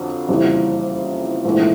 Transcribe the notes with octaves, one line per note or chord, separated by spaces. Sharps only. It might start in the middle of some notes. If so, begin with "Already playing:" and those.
Already playing: F2 D3 F#3
F#1 F2 C#3 E3 G3
A#1 G#2 E3 A3